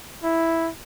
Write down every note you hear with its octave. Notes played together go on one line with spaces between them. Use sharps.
E4